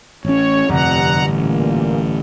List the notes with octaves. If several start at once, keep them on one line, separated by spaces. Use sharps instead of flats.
A1 C#4 C#5
G1 F2 C3 F#5 A#5
A1 A#2